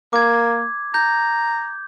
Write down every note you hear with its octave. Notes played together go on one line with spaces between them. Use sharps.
A#3 D6 G#6
A#5 G6